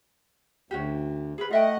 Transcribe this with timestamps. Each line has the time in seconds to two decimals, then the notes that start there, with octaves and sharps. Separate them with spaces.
0.71 D2 C#4 F#4 G4
1.38 G#4 A#4 B4
1.51 A3 F4 D#5 E5 F#5 G5